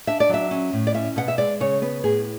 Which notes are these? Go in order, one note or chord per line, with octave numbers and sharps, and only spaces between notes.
D4 E5
D5
F#3 E5
C#4
A2
D5
C#4 E5
B2 F#5
E5
G#3 D5
C#3 C#5
B3 B4
A2 G#4